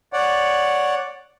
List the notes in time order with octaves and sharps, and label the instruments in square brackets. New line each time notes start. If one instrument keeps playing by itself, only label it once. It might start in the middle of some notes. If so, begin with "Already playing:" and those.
[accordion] C#5 D5 F#5